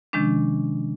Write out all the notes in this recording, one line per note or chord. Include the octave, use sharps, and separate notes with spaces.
C3 D#3 F3 G#3 C#4 D4